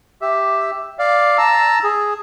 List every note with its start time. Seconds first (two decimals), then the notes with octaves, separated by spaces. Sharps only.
0.22 G4 E5
0.99 D5 F5
1.38 A5 A#5 E6
1.84 G#4